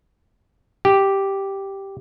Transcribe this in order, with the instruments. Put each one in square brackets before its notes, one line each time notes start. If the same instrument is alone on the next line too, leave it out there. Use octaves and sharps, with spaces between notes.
[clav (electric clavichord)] G4